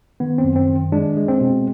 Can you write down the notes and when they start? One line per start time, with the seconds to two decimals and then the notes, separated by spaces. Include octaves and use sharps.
0.20 D#3 B3
0.38 C4
0.44 F#2
0.56 C4
0.68 D#3
0.92 G#3 D4
1.17 G#3
1.28 C4
1.41 B2